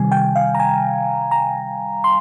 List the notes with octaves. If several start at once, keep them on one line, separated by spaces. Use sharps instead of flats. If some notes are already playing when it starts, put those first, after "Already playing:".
Already playing: C3 D#3 G3 G#5
G5
F5
A#5
G#5
A#5
C6